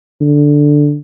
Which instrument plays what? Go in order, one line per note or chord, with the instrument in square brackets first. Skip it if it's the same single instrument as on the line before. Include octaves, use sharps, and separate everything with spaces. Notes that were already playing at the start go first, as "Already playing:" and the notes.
[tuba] D3